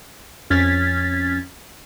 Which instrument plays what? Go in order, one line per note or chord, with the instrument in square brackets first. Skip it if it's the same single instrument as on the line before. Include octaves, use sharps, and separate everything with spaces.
[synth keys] F2 C#4 F6 G#6 A6 B6